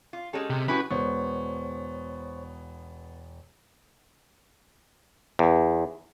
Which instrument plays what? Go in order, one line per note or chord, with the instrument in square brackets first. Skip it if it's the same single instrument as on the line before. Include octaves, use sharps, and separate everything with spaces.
[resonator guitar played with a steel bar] F4
[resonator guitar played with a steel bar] G#3 C#4 A4 [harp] G4 E7
[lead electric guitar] C3
[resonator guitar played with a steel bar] A3 E4 G4 [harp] C#4 F#4 [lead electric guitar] B4
[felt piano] E1 [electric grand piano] B3 [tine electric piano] C5 C#5 C#6
[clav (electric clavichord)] E2